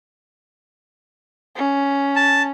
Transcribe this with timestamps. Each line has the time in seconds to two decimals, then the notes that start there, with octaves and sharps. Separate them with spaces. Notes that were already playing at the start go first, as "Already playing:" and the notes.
1.57 C#4
2.16 A5